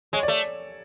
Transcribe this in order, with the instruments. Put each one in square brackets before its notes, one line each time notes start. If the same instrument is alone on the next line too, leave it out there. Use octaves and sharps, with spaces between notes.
[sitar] G#3 [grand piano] C#5
[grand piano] D5
[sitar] A3